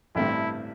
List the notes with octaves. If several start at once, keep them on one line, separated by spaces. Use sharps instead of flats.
A1 G2 D3 A3 C4 E4